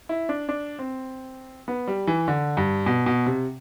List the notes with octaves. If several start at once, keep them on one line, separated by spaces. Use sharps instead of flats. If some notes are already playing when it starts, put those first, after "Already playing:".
E4
D4
D4
C4
B3
G3
E3
D3
G2
B2
B2
C3